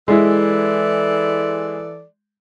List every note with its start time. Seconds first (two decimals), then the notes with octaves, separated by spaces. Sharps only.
0.08 E3 G#3 E4 A4 D5